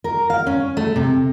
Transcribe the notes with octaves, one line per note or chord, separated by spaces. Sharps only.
A#4
F5
C#4
A3
C3